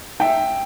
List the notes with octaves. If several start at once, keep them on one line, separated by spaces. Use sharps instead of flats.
E5 G5